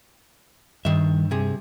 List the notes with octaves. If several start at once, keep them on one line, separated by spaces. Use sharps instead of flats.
G2 D#3 E5
C3 G#4